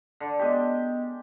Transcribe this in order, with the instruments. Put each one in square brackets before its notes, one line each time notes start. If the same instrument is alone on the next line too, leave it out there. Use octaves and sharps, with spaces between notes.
[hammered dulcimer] D3
[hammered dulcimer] G#3 G4 [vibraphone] B3 D#5 G5